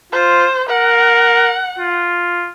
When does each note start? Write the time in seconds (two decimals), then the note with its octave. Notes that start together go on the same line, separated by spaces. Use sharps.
0.12 F4 C5
0.69 A#4 F#5
1.79 F4